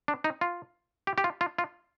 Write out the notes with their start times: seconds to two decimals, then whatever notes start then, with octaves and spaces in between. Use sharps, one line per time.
0.08 D4
0.24 D#4
0.41 F4
1.07 G4
1.18 G4
1.24 F4
1.41 F4
1.58 F4